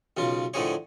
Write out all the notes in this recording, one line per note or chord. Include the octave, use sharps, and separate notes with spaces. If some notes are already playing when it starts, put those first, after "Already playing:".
B1 C#3 F4
A2 D3 F3 G#4 C#5